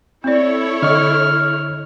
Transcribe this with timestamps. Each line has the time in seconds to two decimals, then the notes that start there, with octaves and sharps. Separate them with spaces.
0.24 C4 E4 A4 C#5 D5
0.82 D3 D#5 C#6 F6